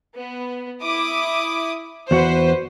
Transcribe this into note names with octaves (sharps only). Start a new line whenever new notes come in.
B3
E4 D6 D#6
E2 F#4 B4 C5 F#5